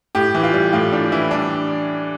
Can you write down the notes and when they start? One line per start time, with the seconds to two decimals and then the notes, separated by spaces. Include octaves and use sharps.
0.15 A2 G4
0.35 E3
0.43 F4
0.54 G3
0.73 A2 F4
0.92 A2 D4
1.12 E3 E4
1.31 G3 D4